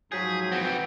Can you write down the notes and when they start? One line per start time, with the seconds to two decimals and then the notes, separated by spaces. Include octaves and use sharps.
0.12 G#2 F3 F#3 G#4 G6 B6
0.52 E3 C4 F#5